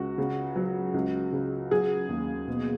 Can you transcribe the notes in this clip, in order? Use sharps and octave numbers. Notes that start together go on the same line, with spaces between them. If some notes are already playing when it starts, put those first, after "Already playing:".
Already playing: C#2 F#4
C#3
F#3
C#2
C#3
F#3 G#4
D#2
B2